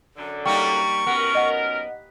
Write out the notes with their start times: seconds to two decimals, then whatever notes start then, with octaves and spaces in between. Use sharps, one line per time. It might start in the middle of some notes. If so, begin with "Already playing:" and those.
0.16 F#2 D3
0.45 G3 A#3 D#4 G5 C#6
1.06 F#2 B3 A#4
1.35 D#5 F#5